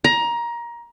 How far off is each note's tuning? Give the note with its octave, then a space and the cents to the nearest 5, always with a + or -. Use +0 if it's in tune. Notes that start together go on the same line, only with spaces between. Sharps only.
A#5 +20